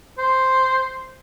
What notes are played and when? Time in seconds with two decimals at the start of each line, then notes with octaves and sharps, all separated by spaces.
0.18 C5